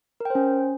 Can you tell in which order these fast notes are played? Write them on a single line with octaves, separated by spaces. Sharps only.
A#4 G5 C5 C#4